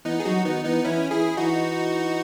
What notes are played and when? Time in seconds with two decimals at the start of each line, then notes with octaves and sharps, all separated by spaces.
0.05 E3 B3 D#4
0.20 G#4
0.25 F#3 D#4 F#4
0.45 D#3 B3 D#4
0.65 E3 B3 D#4
0.84 E3 C#4 E4
1.11 E3 E4 G#4
1.37 E3 D#4 F#4